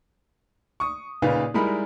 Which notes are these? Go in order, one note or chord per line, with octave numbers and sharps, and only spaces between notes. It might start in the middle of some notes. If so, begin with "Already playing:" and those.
C#6 D#6
A#2 C#3 D#4 B4 F5
G3 G#3 D#4 E4 A#4 B5